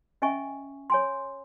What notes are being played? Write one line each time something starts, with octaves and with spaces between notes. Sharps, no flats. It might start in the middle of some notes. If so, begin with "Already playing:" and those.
C#4 D#5 E5 G#5 C#6
C#5 G#5 C6